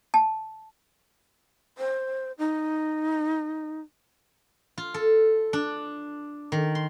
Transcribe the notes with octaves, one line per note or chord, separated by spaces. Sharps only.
A5
C5
D#4
F4
A4
D4
D#3
C6